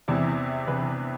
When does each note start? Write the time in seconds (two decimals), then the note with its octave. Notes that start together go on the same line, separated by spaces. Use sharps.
0.08 E2 C3 E3 E4
0.67 C3 E3 B4